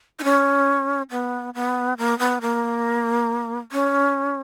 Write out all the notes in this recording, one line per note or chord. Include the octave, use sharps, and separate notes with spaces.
D#4
C#4
B3
B3
A#3
B3
A#3
C#4